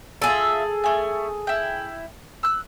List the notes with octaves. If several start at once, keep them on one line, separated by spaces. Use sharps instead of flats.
F4 G#4 A4 E5
A3 G#5
E4 G5
E6 F#6